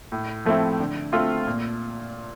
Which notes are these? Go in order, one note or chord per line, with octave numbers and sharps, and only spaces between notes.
A2
F3 A3 C4 E4
D3
A3 C4 F4
A#2